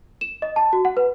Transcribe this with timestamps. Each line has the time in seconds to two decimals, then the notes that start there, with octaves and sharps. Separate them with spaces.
0.21 E7
0.42 D#5
0.56 A5
0.73 F#4
0.85 F#5
0.97 B4